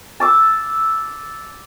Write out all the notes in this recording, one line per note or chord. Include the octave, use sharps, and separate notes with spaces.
A5 D6 E6